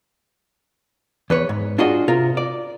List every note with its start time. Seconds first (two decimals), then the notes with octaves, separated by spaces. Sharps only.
1.30 E2 B4 C#5
1.49 G#2
1.78 D4 F4 F#4 G#4 D#5
2.08 C3 F4 A#4
2.37 D5